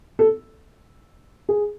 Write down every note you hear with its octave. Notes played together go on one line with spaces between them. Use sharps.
A4
G#4